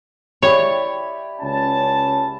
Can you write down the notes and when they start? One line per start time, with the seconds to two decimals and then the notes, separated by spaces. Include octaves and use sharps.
0.42 E4 G4 C#5 D5
1.42 C#2 C#4 A5